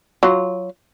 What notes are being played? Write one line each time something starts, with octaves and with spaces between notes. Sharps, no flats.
F#3 F4